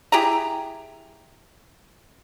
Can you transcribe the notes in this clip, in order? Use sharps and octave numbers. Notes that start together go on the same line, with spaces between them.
E4 G4 G#4 A#5